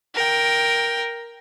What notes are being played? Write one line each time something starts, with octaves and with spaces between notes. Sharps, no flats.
A#4 G5